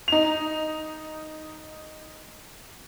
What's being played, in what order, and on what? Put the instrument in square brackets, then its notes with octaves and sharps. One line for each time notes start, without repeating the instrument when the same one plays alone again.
[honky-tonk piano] D#4 F7